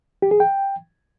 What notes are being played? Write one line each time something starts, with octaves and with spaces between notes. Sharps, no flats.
G4
G#4
G5